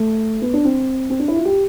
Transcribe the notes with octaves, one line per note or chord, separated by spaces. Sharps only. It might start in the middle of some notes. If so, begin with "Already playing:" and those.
Already playing: A3
B3
D4
C4
C4
D4
E4
F4
G4